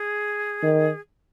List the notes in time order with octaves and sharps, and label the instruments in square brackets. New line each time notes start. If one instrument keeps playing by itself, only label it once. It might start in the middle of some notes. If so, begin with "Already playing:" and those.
Already playing: [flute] G#4
[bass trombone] D#3